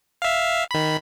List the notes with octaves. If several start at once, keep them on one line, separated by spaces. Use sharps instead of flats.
E5 F5
D#3 B5